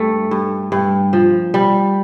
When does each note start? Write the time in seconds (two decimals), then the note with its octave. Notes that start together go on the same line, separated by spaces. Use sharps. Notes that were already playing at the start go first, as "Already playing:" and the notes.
Already playing: G2 A3
0.31 G2
0.72 G2
1.13 F3
1.54 G3